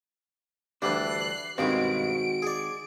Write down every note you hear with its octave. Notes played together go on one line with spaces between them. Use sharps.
D2 E3 G3 D4 F#6 C7
G2 B2 D#3 G#3 C4 F#4 D7
G#4 D5